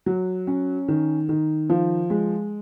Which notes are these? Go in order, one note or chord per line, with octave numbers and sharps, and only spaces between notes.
F#3
C#4
D#3
D#3
F3
G#3